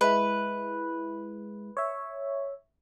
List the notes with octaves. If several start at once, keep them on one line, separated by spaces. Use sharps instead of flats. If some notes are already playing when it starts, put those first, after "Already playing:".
G#3 E4 B4
C#5 E5